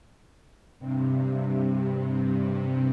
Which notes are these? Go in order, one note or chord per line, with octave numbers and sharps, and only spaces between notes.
G2 C3